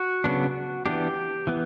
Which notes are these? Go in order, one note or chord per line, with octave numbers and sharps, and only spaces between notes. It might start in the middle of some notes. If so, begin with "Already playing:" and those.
Already playing: F#4
C#3 F#3 B3 D4
E3 B3 D4 G4
E3 B3